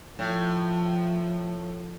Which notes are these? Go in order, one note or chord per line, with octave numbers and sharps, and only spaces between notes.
A2 F3